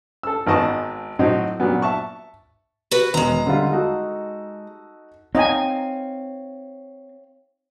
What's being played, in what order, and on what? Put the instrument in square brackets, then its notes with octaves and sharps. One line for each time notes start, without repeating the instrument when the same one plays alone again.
[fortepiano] A4 E6
G#1 G#2 B3 D#5 A5 C#6
A2 F#3 C4 D#4
A#2 F#3 B3
E5 A5 C#6
[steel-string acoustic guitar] F#4 B4
[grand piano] E1 B3 [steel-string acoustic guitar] G#3 A#5
[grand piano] D3 G3 F4
D#4 F#4 A4
[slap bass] C4 [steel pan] D#4 D#5 G#5 [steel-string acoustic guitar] C#5 F5 G5